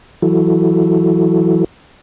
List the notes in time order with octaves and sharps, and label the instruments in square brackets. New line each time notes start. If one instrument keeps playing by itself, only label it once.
[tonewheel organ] E3 F#3 E4 F#4 A4